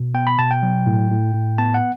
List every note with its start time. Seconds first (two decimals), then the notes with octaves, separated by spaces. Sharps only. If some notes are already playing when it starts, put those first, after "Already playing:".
Already playing: B2
0.14 B3 G5
0.27 B5
0.39 B2 A5
0.51 G5
0.63 F#3
0.86 A2
1.11 A2
1.34 A2
1.58 B3 A5
1.74 F#5